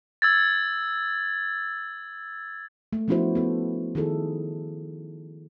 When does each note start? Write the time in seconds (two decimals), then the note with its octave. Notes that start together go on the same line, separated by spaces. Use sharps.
0.22 E6 G#6 A6
2.93 A3
3.08 F3 B3 C#4 E4 F#4 C5
3.35 B3 A4
3.95 D#3 E4 G#4 A4